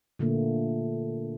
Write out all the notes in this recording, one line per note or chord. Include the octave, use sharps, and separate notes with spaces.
A#2 D3 A3 A#3